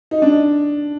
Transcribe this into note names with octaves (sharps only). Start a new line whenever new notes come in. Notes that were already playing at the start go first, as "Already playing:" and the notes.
D#4
D4